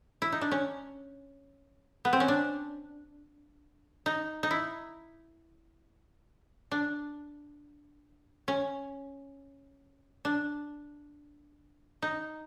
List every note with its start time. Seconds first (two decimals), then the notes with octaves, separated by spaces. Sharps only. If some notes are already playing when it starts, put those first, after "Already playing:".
0.22 E4
0.32 D#4
0.41 D4
0.51 C#4
2.05 B3
2.13 C4
2.20 C#4
2.28 D4
4.06 D#4
4.43 D#4
4.51 E4
6.71 D4
8.48 C#4
10.25 D4
12.02 D#4